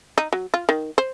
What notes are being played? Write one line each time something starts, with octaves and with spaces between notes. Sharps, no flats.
D#4
F#3
F4
D#3
C5